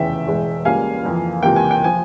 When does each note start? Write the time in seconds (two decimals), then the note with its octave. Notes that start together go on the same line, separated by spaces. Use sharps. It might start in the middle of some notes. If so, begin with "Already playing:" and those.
Already playing: F1 E2 C#3 E3 E5 G5
0.27 E1 E2 E3 G#3
0.65 C#2 C#3 G3 A#3 F5 G#5
1.04 F2 E3 A#3
1.43 C#2 C3 E3 A#3 G5
1.56 G#5
1.71 G5
1.84 F3 G#5